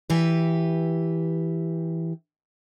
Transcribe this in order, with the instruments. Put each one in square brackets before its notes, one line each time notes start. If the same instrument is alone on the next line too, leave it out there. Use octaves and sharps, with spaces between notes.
[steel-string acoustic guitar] E3 G4 B4